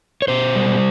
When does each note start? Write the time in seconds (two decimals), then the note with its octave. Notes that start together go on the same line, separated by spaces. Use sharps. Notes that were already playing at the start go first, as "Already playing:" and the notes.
0.22 C#5
0.28 B2 C5
0.55 G3